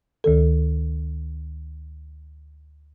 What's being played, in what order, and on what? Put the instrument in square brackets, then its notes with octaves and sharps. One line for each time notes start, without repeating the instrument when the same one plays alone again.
[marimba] D2 D#3 A4